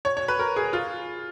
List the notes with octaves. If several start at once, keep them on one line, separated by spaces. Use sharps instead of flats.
C#5
C#5
B4
A#4
G#4
F4